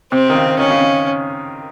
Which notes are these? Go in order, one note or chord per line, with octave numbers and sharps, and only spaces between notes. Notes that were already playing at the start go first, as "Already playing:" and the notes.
C3 C4
D#3
C#3
D#3 C#4
C#3
C#3